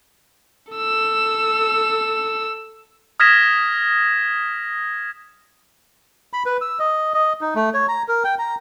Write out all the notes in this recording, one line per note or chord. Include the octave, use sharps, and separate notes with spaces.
A4 E6
D#6 F6 G#6 A#6 B6 E7
B5
B4
E6
D#5
D#5
D#4
A3
C#5
A#5
A#4
G5
A#5